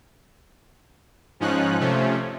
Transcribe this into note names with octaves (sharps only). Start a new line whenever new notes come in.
G#2 F3 C#4 D#4 F#6
C3 F3 A3 C#4